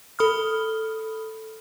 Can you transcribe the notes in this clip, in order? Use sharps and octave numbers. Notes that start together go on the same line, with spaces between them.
A4 B5 D#6 F6